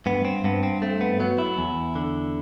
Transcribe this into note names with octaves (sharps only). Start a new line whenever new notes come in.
G2 B3
C4
G2 B3
C4
A3 C4
B3
F#3 B3
E4
E2
D3